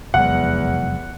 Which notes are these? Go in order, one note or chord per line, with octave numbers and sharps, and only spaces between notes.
F1 E2 F#3 G#3 F#5